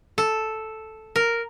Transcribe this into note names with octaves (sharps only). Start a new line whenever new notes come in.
A4
A#4